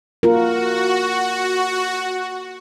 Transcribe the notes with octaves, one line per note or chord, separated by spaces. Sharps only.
A#3 F4 F#4 A#4